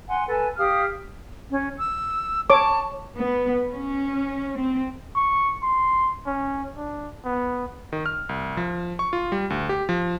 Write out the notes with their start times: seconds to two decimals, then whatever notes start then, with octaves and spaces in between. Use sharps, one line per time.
0.08 F#5 G#5 C6
0.27 A4 B4 G#5
0.57 G4 F5 D#6 F6
1.51 C#4
1.78 E6
2.50 C#5 A5 D6
3.17 B3
3.71 C#4
4.58 C4
5.16 C#6
5.63 C6
6.26 C#4
6.76 D4
7.24 B3
7.93 D#3
8.06 F6
8.29 C2
8.57 F3
8.99 C#6
9.13 F4
9.32 G3
9.50 D2
9.69 G4
9.89 F3